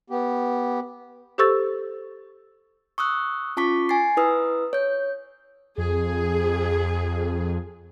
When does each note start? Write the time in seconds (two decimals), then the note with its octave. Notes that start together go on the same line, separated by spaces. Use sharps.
0.10 B3 G4
1.38 G4 A4 C5 C#6 E6 A6
2.98 C#6 D#6 E6 F#6
3.57 C#4 F4 A5 C#6 D6 B6
3.89 G#5 A6 C7
4.17 E4 B4 D#6 E6
4.73 C#5 G6
5.78 F2 G#4